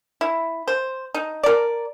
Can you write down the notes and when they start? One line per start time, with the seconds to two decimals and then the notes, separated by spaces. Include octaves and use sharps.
0.21 E4
0.68 C5
1.14 D#4
1.44 A#4 D5